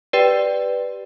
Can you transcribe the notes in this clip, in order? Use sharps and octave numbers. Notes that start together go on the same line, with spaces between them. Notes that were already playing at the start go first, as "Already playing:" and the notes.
G4 B4 D5 G5